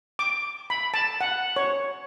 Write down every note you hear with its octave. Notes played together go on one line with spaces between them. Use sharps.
D6
B5
A5
F#5
C#5